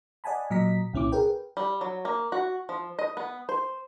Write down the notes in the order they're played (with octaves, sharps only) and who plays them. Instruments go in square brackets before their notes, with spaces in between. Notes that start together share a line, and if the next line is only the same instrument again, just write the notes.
[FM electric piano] D5 D#5 F#5 G#5 A5 B5
A#2 F#3 D#5 A#5 B6
C2 A#2 C#4 E4 D6
G#4 A#4 B4 G5
[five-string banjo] G3
F#3
A#3
F#4
F3
D#5
B3
C5